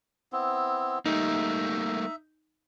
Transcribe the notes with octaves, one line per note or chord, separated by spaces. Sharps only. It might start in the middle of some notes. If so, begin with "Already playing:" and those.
B3 C4 E4
G3 A3 A#3 D#4 E5